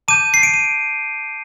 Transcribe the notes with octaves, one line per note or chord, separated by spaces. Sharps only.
A5 D6 G6 D#7
C7
D7
D#7